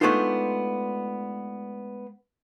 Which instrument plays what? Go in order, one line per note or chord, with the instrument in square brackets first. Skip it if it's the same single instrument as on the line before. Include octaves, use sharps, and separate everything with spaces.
[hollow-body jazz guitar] G#3 A3 B3 D4 D#4 F4